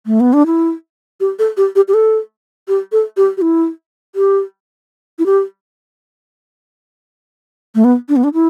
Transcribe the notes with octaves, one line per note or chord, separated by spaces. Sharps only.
A3
B3
D4
E4
G4
A4
G4
G4
G4
A4
G4
A4
G4
G4
E4
G4
E4
G4
A3
B3
D4
B3
D4
E4